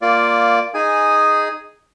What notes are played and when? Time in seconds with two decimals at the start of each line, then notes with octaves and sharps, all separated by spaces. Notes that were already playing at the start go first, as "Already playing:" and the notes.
0.02 A#3 F4 D5
0.74 D#4 G#4 G#5